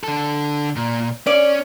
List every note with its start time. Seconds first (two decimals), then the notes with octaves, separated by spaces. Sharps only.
0.04 D3 A4
0.76 A#2
1.27 C#4 D5